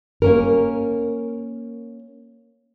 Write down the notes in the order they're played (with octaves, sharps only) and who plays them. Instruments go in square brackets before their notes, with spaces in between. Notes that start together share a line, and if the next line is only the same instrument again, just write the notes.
[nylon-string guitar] A#3 C#4 A#4